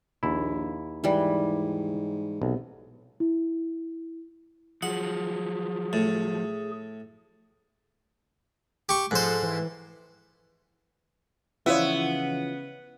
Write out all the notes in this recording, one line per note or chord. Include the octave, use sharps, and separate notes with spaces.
A#1 D#2 E4
G#2 E3 G3
B1 C3
E4
F3 F#3 G#4 F#5
A2
G4 C#6
G#2 F3 A4 C5 F#6
E3
C#3 E3 F3 B3 F4 C#5 E5